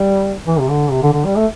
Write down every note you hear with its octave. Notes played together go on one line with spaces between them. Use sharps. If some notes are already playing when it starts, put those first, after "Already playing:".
Already playing: G3
E3
C3
D3
C3
D3
D3
G3
A3